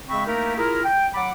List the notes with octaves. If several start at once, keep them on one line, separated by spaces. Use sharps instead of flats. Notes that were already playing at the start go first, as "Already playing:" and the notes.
C#3 G#3 C4 E5 B5 C#6
A3 A#3 D#4 E4 G4 A#4
E4 F4 G#4 A#4
G5
F#3 F#5 B5 D6